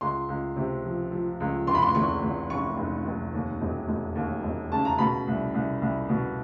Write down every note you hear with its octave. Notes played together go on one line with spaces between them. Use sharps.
C#2 C6
C#2
C3
F3
F3
C#2
F1 C6
B5
C6
E2 C#6
E2
F1 C#6
F1
F1
D#2
E1
E1
D#2
E1
C#3 A5
A#5
B2 B5
C2
C2
C2
B2